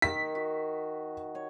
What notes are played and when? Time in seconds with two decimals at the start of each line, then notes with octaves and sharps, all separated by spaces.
0.02 D#3 B6
0.35 F#4
1.35 C#5